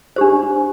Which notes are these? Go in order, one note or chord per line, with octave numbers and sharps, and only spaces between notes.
D4 G4 C5